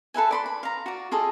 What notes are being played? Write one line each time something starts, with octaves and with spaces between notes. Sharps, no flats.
A4 B4 E5 G#5
D5 B5 C6
B5
F5 A#5
F#4 D5
F4 G#4 A4 D#5